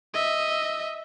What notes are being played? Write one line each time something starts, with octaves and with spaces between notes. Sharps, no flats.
D#5 E5